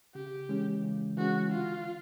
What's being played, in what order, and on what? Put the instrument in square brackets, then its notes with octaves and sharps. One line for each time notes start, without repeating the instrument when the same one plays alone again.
[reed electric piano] C#3 [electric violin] G4
[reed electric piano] E3 G#3 C#4
C#3
[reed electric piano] E3 G#3 C#4 [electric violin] F#4
[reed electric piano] D3 [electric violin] F4